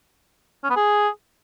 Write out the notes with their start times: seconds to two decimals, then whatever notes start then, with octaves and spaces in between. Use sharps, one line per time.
0.64 C#4
0.70 B3
0.76 G#4